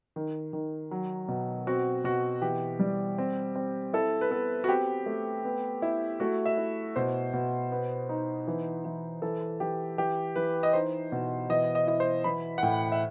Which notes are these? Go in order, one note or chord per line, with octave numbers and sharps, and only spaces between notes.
D#3
D#3
F#3
B2
C4 F#4
B2 F#4
E3 G4
G3
C4
C4
E4 A4
B4
B3 A4
F#4
C4 G4
A3
B3
E4
A3 F#4
E5
E4
B2 C5
B2
B3
D#4
E3
E3
E3 A4
E3 G4
E3 G4
E3 B4
D#5
D#4 C5
B2
E3 D#5
D#5
E4 D#5
C5
E3 B5
F#5
A2 G5
E5